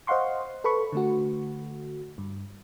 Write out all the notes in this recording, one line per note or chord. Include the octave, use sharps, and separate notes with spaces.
C5 D#5 F5 F#5 C6 C#6
A4 B4 B5 C#6
D3 A3 F#4
G2